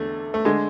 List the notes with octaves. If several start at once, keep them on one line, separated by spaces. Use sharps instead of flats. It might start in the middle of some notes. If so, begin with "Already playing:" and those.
Already playing: E2 D3 A3
A3
D3 G#3